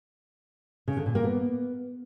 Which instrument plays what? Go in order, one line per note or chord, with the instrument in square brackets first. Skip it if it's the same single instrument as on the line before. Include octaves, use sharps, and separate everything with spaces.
[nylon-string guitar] C#3
D3
A#2
A#3
B3